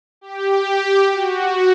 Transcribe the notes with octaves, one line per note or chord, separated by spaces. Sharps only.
G4
F#4